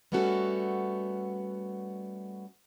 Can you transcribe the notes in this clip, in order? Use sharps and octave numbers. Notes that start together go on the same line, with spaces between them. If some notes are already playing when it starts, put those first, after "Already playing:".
G3 A3 B3 C#4 F#4 A4